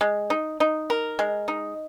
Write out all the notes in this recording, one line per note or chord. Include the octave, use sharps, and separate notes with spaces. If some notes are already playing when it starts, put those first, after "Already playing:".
G#3
D#4
D#4
A#4
G#3
D#4